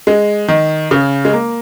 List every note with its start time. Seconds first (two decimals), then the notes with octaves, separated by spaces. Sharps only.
0.07 G#3
0.48 D#3
0.91 C#3
1.25 G#3
1.33 A#3